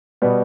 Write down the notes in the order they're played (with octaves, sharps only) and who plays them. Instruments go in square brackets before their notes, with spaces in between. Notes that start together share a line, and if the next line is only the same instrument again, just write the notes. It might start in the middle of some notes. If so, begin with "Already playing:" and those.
[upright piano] B2 G3 B3